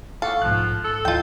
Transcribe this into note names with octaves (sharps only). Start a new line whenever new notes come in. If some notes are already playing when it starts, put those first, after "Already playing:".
A4 F5 F#5 C#6 D6
B1 G#2 F3 F#6
A4 C#7
D2 E3 F4 D#5 G5